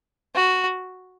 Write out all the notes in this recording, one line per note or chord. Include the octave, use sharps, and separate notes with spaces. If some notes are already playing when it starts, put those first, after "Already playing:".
F#4